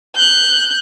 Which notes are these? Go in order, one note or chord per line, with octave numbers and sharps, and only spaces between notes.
F#6 G6